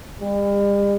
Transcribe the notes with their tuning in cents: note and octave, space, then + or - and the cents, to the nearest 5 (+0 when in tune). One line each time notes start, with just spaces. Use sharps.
G3 +45